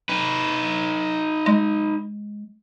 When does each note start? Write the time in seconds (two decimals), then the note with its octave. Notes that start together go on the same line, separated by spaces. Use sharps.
0.09 D#4 B4
1.46 G#3